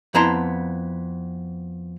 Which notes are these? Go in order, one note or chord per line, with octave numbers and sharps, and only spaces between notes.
F2 B3 E4 A5 A#5 C6